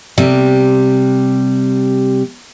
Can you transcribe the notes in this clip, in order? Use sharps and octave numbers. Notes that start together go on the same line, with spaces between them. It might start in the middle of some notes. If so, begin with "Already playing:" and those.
C3 G3